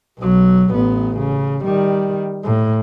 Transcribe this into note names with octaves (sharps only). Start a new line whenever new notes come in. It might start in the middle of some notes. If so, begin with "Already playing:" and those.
B1 F#3
A1 B3
C#3
D#3 G3
A2